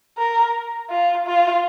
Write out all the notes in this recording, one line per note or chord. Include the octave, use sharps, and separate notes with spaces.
A#4
F4
F4